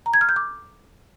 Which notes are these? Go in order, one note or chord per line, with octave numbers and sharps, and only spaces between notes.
A#5
G#6
F6
G6
D6